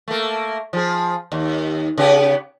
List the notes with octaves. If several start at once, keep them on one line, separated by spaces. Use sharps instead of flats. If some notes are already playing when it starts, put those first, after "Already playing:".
A3 A#3
F3 G#4
D#2
C#3 B3 G4